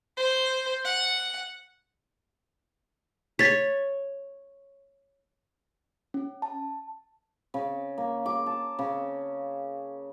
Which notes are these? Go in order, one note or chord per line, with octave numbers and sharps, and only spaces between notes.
C5
F#5
C#5 A6 B6
C#4
A5
C#3
A#3
D6
A5
C#3